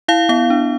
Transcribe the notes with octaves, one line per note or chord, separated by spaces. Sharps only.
E4 F5
B3 F5
D4